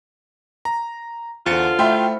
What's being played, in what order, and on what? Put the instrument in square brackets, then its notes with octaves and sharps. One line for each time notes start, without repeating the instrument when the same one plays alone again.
[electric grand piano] A#5
[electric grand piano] E2 A6 C#7 [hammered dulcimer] D3 C5 [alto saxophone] F4
[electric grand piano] A3 [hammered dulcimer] E4 F#4 D#5 [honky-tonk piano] E5 G5 C6